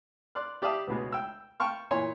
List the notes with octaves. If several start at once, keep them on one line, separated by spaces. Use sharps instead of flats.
D5 C6 F6 F#6
G4 D5 E5 F5 A5 D#6
C#2 B2 G#3
G5 E6
G5 A5 C#6 F6
A#2 E3 C#5 G#5 C6